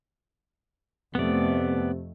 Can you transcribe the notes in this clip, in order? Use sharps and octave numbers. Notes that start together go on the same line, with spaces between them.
F2 C3 A3 B3 D5